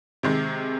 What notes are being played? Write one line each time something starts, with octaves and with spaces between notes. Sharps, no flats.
C3 D#3 G#3